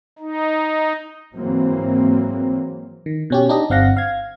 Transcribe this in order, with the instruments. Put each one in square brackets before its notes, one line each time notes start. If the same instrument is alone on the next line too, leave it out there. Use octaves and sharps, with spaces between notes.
[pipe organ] D#4
[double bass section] G#2 E3 F#3 A#3 C4
[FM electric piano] D#3
B2 C#4 G4
D4 D#4 G4 D#5
G1 C4 F5 F#5 A#6
F5 G#6